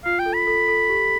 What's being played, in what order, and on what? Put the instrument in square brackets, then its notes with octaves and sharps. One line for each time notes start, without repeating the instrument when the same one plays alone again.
[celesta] F4 [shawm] F5
[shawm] G5
[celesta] A4
[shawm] B5
[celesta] A4
A4
G4